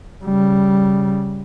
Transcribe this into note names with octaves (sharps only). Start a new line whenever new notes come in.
C#3 G3